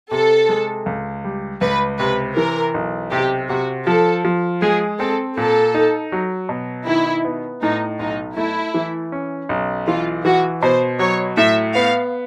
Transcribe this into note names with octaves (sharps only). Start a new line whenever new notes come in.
C3 A4
G#3
C#2
G3
C#2 B4
C3 B4
E3 A#4
B1
C3 G4
C3 F#4
F3 A4
F3
G#3 G#4
C4 A4
A#2 A4
D#4
F#3
B2
D#3 E4
B3
A2 D#4
B1 D#4
A3 E4
E3
C#4
B1
E3 F4
E3 F#4
B2 C5
F#3 C#5
A2 E5
B3 F5